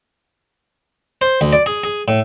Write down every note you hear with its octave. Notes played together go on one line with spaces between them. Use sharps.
C5
D2
D5
G#4
G#4
A2